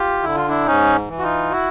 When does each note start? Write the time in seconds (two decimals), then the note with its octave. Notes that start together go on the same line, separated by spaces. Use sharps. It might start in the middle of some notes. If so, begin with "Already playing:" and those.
Already playing: F4 G4
0.23 D3 E4
0.36 F4
0.48 D4 E4
0.66 G#2 C#4 D#4
1.08 E3
1.19 F#4
1.23 D#4 F4
1.51 E4 F#4